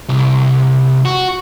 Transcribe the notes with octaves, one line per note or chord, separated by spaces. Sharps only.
C2
F#4